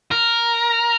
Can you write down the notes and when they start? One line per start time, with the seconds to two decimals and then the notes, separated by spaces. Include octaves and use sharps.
0.11 A#4